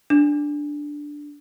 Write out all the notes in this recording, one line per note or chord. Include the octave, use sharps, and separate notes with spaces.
D4